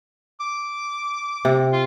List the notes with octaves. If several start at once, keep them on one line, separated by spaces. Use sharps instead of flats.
D6
C3
F4